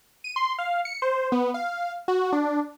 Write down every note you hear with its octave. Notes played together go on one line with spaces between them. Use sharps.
D#7
C6
F5
C#7
C5
B3
F5
F#4
D4